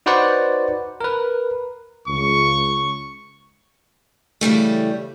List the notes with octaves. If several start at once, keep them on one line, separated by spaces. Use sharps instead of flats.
D#4 F#4 B4 C5 D5 F#5
A#4 B4
C#2 C#6
C#3 E3 G3 A3